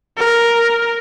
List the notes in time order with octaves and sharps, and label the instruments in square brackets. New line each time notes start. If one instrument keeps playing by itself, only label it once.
[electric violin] A#4